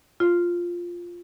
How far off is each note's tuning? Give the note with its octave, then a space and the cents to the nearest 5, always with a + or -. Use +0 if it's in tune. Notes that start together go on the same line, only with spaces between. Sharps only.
F4 +0